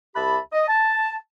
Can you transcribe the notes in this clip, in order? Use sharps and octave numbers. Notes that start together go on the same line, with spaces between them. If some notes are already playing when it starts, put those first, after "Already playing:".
C2 G4 E5 A5 B5
D#5
A5